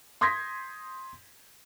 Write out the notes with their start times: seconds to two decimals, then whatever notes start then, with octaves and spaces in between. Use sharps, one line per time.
0.21 C6 D#6 G6 G#6 A#6 B6